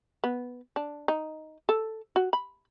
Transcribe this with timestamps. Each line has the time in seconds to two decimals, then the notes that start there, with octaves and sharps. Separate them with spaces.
0.24 B3
0.76 D4
1.08 D#4
1.69 A4
2.16 F#4
2.33 B5